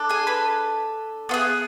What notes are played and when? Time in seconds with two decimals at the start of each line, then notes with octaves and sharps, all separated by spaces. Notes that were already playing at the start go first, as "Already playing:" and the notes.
Already playing: D4 A4
0.09 G#4 G#5
0.27 B4 B5
1.29 B3 F4
1.34 G#4